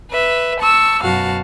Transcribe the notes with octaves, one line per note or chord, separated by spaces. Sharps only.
B4 E5
A5 C#6 E6
F#2 B2 F#4 F5 A5